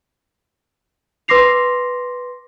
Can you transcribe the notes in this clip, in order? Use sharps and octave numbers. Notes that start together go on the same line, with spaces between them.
B4 C6 D6 A#6 C7 F7